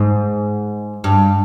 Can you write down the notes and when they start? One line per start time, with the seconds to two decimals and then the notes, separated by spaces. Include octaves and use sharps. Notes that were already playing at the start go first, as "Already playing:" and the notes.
Already playing: G#2
1.04 G2